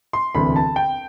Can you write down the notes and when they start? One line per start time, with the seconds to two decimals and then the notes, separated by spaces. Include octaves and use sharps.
0.13 C6
0.35 E1 D2 C3 E3 B3 B5
0.56 A5
0.76 G5